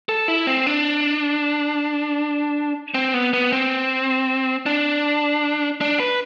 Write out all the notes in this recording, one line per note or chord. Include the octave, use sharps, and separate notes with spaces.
A4
E4
C4
D4
C4
B3
B3
C4
D4
D4
B4